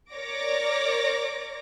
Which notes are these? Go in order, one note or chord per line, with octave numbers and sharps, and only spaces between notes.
A#4 C#5 D5 D6 A#6